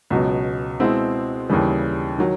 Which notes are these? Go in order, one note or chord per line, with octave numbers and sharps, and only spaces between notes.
C#2 B2 F#3
B2 G#3 C4 E4
D#2 C#3 E3 G3
D#3 F#3